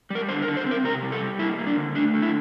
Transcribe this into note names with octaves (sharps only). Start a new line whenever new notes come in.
G3 A#4
D3 C5
A#4
D3
C5
C4 A#4
C3 A#4
G3
A4
G3
A#3 E4
A#3
D4
D3
A3 D4
D3
E4